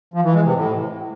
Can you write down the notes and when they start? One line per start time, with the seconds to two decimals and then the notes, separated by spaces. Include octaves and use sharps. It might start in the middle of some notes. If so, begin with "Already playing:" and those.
0.14 F3
0.24 E3
0.34 G#3
0.45 C3
0.55 A2